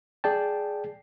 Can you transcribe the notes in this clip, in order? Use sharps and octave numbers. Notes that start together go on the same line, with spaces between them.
G#4 D5 G5 A5